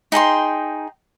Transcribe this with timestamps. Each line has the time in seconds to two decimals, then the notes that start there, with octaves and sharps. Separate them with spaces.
0.12 D#4 G#4 G5 C6